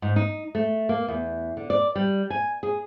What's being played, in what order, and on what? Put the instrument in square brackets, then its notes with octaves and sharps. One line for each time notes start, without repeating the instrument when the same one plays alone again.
[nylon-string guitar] G#2
D#4
A3
A#3
E2
D3
D5
G3
G#5
G#4